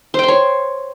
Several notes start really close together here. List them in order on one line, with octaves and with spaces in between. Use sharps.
C5 G5 C6 C#5